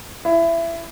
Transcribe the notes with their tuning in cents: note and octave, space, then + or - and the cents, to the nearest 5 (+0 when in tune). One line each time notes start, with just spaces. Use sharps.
E4 +20